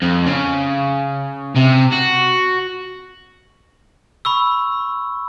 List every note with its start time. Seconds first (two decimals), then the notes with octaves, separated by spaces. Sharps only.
0.02 F2
0.26 C#3
1.56 C3
1.93 F#4
4.25 B5 C#6 E6